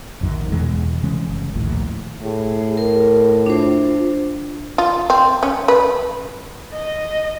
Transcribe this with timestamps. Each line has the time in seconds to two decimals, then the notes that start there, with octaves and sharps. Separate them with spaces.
0.21 A#1 F#2 D#3 F#3
0.52 E2 B2 E3 G#3
1.03 C3 E3 G#3 C#4
1.29 F#1
1.56 A#1 D#2 A2
2.24 A2 G#4
2.77 A#4
3.46 D4 F4 C5
4.78 F4
5.10 C4
5.43 C#4
5.68 B4
6.73 D#5